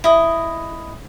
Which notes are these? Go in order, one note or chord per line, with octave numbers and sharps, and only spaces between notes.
E4 D#5